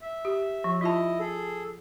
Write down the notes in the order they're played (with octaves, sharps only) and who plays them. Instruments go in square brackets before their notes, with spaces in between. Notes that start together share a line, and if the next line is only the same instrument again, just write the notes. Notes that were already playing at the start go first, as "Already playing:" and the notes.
[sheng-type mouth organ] E5
[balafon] G4
F3
[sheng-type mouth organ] E4 D#5 [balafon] F4 A5
[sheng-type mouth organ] G#4 A4